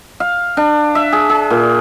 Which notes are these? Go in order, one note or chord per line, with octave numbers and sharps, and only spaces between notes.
F5
D4
E5
G#4
G#4
A#2